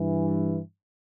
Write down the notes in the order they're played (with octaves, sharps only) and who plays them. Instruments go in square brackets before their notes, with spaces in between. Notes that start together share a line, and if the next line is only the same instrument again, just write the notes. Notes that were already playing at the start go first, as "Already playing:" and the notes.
Already playing: [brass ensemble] G2 E3